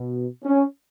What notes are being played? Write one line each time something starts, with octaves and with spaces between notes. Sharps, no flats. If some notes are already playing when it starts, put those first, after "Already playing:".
Already playing: B2
C#4